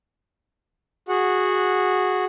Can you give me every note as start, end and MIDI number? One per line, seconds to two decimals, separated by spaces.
1.09 2.25 66
1.09 2.25 68
1.09 2.25 78